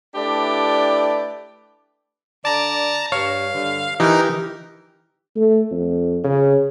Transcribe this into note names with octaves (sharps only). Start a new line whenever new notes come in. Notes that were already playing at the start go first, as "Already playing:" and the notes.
A3 D4 E4 G4 B4 D5
D3 D5 A5 A#5
G2 C#5 F5
G2 D3
E3 D#4 G4 A#4
A3
F2
C#3